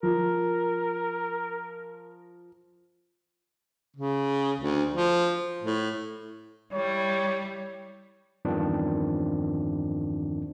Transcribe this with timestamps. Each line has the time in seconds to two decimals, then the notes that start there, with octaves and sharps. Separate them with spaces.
0.03 F3 A#4
3.96 C#3
4.60 D2
4.94 F3
5.63 A2
6.73 G3 E4 C#5
8.45 E2 G2 D#3 F3 C4 D4